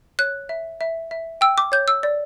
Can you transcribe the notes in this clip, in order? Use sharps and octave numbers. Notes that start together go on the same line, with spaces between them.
C#5 F#6
E5
E5
E5
G5 E6
D6
C#5 G6
E6
D5